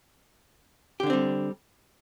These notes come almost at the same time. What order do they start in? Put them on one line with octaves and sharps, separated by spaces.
G4 D3 D4 C4 G3